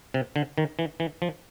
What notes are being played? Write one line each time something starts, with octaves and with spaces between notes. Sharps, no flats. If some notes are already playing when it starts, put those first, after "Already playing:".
C3
D3
D#3
E3
E3
F3